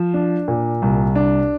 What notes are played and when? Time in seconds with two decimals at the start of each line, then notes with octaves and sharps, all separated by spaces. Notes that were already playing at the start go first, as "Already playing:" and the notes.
Already playing: F3
0.14 D4
0.48 A#2
0.82 C2
1.16 D4